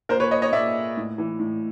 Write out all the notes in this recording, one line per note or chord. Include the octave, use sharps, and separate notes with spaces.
A#2 A#4 C5
B4 C#5
C#5 D#5
C#5 D#5
A#2 D5 E5
A2
E3
A2